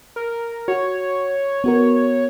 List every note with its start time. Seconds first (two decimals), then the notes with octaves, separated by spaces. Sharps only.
0.16 A#4
0.68 F#4 C#5
1.64 B3 F#4 A#4